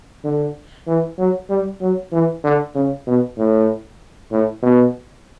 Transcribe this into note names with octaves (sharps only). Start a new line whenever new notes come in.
D3
E3
F#3
G3
F#3
E3
D3
C#3
B2
A2
A2
B2